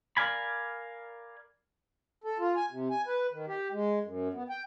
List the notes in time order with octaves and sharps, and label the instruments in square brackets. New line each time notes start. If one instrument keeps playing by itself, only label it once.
[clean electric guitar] A#4 D5 F5 G#5 B5
[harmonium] A4
F4
G#5
C3
G#5
B4
D#3
G4
G#3
F#2
B3
G5